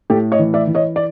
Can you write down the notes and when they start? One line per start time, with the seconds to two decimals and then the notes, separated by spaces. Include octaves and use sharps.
0.10 A2 G4 A4
0.32 C#5 D#5
0.39 E3
0.54 D5 E5
0.67 E3
0.75 C#5 D#5
0.96 D5